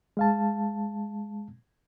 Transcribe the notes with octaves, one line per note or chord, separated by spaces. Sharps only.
G#3 F5 A5